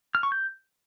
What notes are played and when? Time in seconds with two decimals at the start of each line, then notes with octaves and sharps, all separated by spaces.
0.15 F6
0.23 C#6
0.32 G6